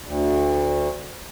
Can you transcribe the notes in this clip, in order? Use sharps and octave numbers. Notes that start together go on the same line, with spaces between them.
D2